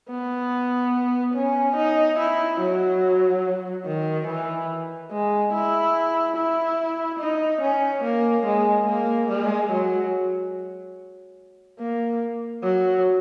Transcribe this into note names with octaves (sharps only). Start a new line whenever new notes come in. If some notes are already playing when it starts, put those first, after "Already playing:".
B3
C#4
D#4
E4
F#3
D#3
E3
G#3
E4
E4
D#4
C#4
A#3
G#3
A#3
G#3
F#3
A#3
F#3